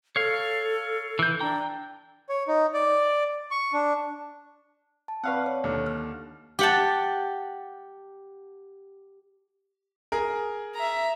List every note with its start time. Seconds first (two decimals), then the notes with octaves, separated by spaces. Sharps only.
0.16 A4 C#5 F5
1.19 E3 G6
1.40 D4 G5 A#5
2.29 C#5
2.48 D#4
2.74 D5
3.51 C#6
3.73 D4
5.08 A5
5.24 C4 B4 D5 F5 F#5 C#6
5.46 C#5
5.64 D#2 D3
5.86 F6 F#6
6.59 G4 F#5 A5
10.12 G#4 A#4
10.75 E5 A#5